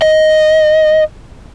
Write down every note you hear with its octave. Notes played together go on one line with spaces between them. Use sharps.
D#5